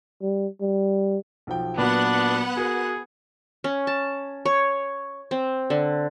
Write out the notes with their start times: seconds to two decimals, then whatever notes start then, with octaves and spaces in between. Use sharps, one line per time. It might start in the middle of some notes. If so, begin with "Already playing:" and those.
0.22 G3
0.61 G3
1.47 B1 F3 G5
1.78 A#2 F#3 B3 D4 F#5
2.57 F#4 G#4 A#4
3.64 C#4
3.87 A5
4.46 C#5
5.31 C4
5.70 D3